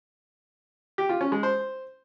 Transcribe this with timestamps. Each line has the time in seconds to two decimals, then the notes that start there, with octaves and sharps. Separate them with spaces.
0.98 G4
1.09 F4
1.21 C#4
1.32 G#3
1.43 C5